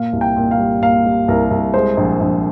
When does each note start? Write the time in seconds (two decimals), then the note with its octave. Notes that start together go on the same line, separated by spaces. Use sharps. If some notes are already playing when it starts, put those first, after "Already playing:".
Already playing: A#2 F5
0.13 C2
0.21 G5
0.36 A#2
0.51 F5
0.59 G3
0.82 A#2 F5
1.06 G3
1.28 C2 A#4
1.51 C2
1.74 G#3 C5
1.97 A#1
2.21 A#1